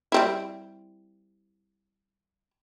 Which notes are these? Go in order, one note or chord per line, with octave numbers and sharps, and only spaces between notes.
G3 C4 E4